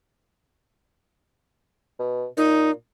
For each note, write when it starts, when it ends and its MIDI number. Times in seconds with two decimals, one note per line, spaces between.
1.99 2.25 47
2.37 2.72 46
2.37 2.71 63